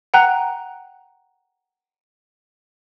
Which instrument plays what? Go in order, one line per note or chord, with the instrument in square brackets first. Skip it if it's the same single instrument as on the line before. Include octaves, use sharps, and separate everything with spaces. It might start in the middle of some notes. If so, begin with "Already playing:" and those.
[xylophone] F#5 G5 A#5 F#6